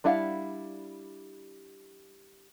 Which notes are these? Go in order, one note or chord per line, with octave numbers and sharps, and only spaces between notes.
G3 D4 E4 F5 F#5